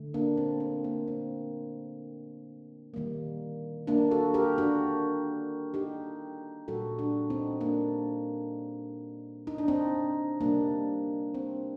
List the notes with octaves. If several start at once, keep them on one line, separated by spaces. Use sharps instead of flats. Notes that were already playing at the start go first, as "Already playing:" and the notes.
Already playing: D3 A3
A#3 D4
C4
C4
A#3
C4
D#3 G3 A#3
A#3 D4
F#4 A4
G4 A#4
D4 F#4
D#4 G4
A#2 G3 A#3 F#4 A4
D4 F#4
C4 D#4
A#3 D4
D#4
D4
C4 D#4
C3 G3 A#3 D4
C4